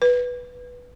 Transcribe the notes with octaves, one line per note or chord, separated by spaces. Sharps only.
B4